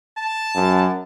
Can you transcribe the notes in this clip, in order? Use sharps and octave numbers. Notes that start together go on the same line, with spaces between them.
A5
F#2